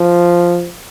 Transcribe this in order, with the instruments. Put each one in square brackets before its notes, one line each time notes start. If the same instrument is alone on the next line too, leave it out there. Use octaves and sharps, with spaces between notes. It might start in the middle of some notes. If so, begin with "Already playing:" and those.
Already playing: [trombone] F3